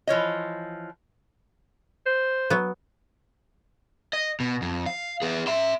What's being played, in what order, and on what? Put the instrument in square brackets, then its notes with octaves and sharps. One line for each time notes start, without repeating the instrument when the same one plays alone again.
[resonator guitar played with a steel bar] E3 F3 C#5 D#5
[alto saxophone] C5
[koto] F#3 B3
[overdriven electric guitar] D#5
B2
F2
F5
B3 G#4
E5 C6